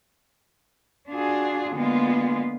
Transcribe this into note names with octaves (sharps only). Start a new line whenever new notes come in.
D4 F4 F#4 G#4
D3 G#3 A#3 B3 F4 B4